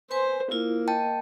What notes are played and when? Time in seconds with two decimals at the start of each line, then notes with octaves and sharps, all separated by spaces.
0.11 B4 C5 G#5 C6
0.51 A#3 E4 F4
0.88 D#5 G5 A5